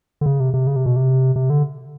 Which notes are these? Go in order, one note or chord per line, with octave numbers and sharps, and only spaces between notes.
D3
C#3
C3
C3
C#3
C3
B2
C3
C3
D3